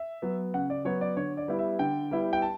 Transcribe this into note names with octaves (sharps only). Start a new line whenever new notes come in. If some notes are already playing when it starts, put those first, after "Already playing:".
Already playing: E5
F#3 B3
C#3 F#5
D5
F#3 B3 C#5
D5
D3 C#5
D5
G3 B3 E4
E5
D3 G5
G3 B3 E4
G5
A5